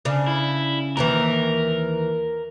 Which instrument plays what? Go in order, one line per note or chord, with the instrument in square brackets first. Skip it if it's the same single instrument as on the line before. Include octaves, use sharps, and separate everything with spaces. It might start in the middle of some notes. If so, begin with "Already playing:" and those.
[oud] C#3 D4
[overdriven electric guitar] E4
[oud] D#2 D#3 E3 [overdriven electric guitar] A#4